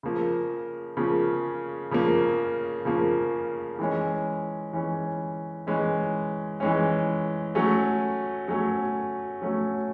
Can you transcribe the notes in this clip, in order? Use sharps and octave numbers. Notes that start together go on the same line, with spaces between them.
C#3 F3 A#3
C#3 F3 A#3
C#3 F3 A#3
C#3 F3 A#3
E3 G#3 C#4
E3 G#3 C#4
E3 G#3 C#4
E3 G#3 C#4
F#3 A3 C#4
F#3 A3 C#4
F#3 A3 C#4